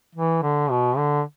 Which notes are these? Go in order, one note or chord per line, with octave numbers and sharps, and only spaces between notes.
E3
D3
B2
D3